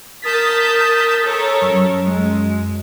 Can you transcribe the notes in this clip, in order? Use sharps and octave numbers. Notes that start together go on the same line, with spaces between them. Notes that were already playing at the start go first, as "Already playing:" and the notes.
A#4 A5 D#6 G6 A6 B6
A4 A#4 C#5
F#2
G#3